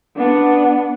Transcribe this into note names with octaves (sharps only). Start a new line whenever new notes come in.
B3 D4